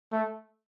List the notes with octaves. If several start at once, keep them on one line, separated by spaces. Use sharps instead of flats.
A3